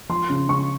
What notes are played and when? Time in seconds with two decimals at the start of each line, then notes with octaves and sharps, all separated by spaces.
0.09 F3 C6
0.30 C#3
0.49 C#3 C#6